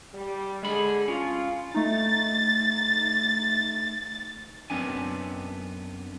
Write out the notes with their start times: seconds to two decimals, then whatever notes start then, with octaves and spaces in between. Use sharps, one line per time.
0.13 G3
0.63 D3 G#3 G#4 B5
1.08 C#4 F4
1.74 A3 D#4 A6
4.70 F#2 B3 C4 D4 G#5